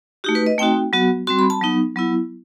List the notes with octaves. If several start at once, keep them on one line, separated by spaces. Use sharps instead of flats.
A3 D#4 F#4 G4
B4
D#5
A3 C4 D#4 F#4 G5
F#3 B3 F#4
G3 C4 F#4 C6
B5
A5
F#3 B3 D#4
F#3 B3 E4